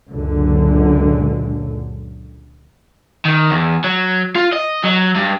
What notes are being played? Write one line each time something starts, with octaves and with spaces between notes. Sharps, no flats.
C#2 F#2 A#2 D3
D#3
E2
F#3
F4
D#5
F#3
G2